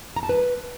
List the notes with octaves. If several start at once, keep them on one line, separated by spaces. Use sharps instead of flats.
A#5
A5
B4